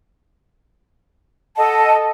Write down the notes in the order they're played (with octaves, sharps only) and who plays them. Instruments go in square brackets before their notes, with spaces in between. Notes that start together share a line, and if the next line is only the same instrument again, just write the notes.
[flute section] A4 D#5 F#5 [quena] A5